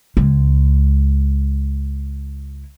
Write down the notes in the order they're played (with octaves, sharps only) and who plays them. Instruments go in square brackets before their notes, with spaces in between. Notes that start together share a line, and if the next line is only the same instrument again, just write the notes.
[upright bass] C#2 G#3